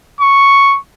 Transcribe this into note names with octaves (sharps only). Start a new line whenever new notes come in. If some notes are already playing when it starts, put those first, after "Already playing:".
C#6